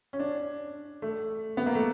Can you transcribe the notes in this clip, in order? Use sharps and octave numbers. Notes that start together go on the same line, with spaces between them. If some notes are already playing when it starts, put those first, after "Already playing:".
C#4
D4
A3
B3
A#3
A3